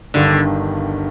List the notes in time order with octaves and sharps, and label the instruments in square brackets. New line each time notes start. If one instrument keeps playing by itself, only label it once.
[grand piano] G1 G2 D#3 [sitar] D3